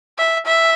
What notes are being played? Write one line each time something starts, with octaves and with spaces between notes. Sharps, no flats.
E5
E5